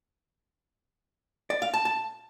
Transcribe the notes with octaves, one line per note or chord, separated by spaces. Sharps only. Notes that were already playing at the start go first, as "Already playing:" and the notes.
D5
F5
A5
A5